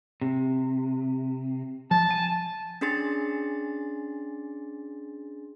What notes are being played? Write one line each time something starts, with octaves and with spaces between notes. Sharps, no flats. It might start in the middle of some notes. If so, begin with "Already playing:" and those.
C3
F3 A5
G#5
C#4 D4 G#4 C6 A6